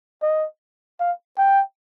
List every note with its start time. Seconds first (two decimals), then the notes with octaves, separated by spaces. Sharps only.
0.22 D#5
1.00 F5
1.38 G5